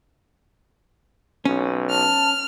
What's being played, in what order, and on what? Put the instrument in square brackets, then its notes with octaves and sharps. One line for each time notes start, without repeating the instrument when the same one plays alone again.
[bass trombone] B1 [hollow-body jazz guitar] C#4
[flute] A5 [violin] F6